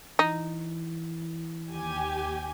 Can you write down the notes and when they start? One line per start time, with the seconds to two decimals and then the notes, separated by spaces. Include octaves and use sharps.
0.19 E3 D#4
1.73 D#2 G4 G#5